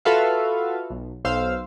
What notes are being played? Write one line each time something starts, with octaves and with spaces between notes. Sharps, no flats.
F4 F#4 A4 B4 E5 F5
B1
B1 C5 F5 E6